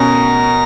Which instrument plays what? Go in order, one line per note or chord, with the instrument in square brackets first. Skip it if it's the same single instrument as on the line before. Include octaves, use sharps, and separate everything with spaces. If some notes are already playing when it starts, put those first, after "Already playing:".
Already playing: [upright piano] B2 C#4 [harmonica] A#4